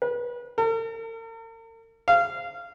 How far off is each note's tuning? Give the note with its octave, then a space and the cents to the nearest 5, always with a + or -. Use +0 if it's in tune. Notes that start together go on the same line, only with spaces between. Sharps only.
B4 -30
A#4 -45
F5 -20